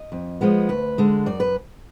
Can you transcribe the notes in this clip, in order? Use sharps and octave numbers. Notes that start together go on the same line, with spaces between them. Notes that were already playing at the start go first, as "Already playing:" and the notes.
Already playing: D#5
F2
F3 G#3 B3
D2 B4
D3 G#3
F#2 D5
B4